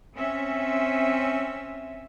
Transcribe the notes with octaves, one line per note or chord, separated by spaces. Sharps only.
C4 C#4 E5